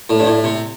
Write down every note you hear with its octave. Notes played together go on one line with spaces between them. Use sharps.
A2
G2
A2
C3